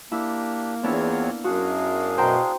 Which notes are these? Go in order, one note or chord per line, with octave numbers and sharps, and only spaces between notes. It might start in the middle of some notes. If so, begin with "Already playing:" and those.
A#3 D4 E4 G4
E2 B3 C4 D4 E4 F4 C#5
F#2 D4 F#4 G#4 F5
B2 C5 G5 A#5